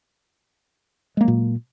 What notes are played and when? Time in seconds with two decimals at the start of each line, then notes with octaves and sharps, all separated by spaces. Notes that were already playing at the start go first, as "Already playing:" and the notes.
1.17 G#3
1.21 A#3
1.24 F#3
1.28 A#2